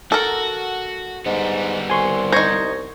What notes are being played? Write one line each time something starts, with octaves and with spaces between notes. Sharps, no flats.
F#4 A4 A#4
G#2 G3 B3
C2 G#5 C6 C#6
D#4 C5 C#6 G#6 A#6